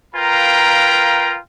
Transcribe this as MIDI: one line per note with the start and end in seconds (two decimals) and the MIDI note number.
0.15 1.38 65
0.15 1.38 70
0.15 1.38 71
0.15 1.38 77
0.15 1.38 79
0.15 1.38 82